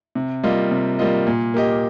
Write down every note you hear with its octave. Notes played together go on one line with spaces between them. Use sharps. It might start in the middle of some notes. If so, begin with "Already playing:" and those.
C3
G3 A#3 F4 D#5
C3
G3 A#3 F4 D#5
A#2
A#3 G4 D#5